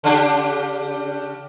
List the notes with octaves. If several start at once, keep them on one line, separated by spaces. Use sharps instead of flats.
C#3 D4 G4